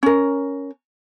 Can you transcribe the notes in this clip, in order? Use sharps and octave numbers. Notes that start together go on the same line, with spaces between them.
C#4 A#4